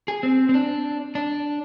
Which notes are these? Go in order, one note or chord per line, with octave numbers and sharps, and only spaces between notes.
G#4
C4
C4
D4
D4